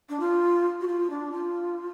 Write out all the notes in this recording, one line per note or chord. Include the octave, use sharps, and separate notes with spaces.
D4
F4
F#4
F4
D4
F4